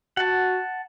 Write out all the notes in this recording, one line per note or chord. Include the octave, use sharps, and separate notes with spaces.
F#4 F#5 A5